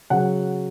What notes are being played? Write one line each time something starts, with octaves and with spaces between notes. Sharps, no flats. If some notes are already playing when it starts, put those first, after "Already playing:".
C#3 F#3 F#5